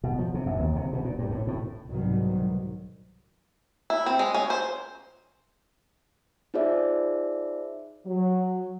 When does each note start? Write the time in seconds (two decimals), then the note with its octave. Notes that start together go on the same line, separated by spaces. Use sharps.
0.04 B2
0.19 F3
0.34 C3
0.46 F#2
0.59 D#2
0.76 C3
0.93 B2
1.05 A#2
1.19 G2
1.31 A2
1.47 A2
1.87 C2 G#2 B2 D#3 F#3
3.90 E4
4.06 C4
4.19 G#3
4.34 C#4
4.50 C5
6.54 D#4 F4 G#4 C5 D5 E5
8.06 F#3